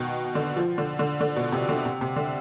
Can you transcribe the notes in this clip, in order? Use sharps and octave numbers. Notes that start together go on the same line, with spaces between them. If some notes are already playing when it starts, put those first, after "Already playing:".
Already playing: B2 D#3
D3
F3
D3
D3
D3
B2
C3
D3
C3
C3
D3